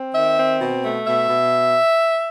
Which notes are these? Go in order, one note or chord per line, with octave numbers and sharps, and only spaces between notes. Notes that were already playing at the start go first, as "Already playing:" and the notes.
Already playing: C4
D#3 E5
C4
B2
A3
B2 E5
B2